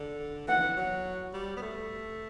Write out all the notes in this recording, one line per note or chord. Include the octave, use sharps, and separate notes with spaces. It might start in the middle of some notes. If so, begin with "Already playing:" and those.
Already playing: D3
E3 F#5
E3
F#3
G3
B3
A3